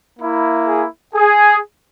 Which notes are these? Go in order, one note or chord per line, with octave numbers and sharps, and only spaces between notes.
A#3 E4
G#4
G#4